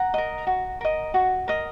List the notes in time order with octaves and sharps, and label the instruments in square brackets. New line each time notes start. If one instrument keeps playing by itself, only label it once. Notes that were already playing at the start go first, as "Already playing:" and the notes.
Already playing: [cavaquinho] F#5 A#5
A#4 D#5
F#4
A#4 D#5
F#4
A#4 D#5